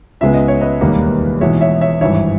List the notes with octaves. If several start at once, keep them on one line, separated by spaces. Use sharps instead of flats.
C#2 C#3 G#3 B3 E5
D#5
C#5
B4 D#5
E1 D#2 D#3 G3 A#3
E2 B2 G#3 C#5 E5
C#5 E5
C#5 E5
G#1 G2 E3 C#5 E5